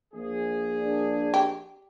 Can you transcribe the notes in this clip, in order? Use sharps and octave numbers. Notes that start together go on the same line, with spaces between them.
A#1 G#4
D4
G4